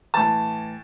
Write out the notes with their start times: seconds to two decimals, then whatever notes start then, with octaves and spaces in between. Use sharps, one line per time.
0.14 A2 E3 A5